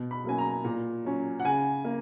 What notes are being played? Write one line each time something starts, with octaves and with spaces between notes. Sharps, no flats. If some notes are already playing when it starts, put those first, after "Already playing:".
Already playing: B2
B5
F#3 A#3 C#4 G#5
A#5
A#2
F#3 C#4
F#5
C#3 G#5
A#3